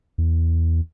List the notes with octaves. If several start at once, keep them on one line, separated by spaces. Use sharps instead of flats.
E2